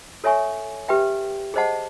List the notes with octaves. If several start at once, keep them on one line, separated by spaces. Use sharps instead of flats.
A4 C#5 E5 G#5 C#6
G4 B4 E5 G5
G#4 C5 D#5 F#5 A5